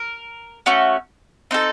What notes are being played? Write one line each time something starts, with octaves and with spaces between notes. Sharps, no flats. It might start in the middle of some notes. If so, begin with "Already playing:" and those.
Already playing: A#4
A3 C#4 F#4
C4 D#4 A4